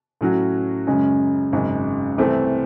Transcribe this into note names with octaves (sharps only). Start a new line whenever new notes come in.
A2 F#3 C#4 F#4
F#2 C#3 G#3 C#4
G#1 F#2 C#3 G#3
C2 C3 E3 A3 C4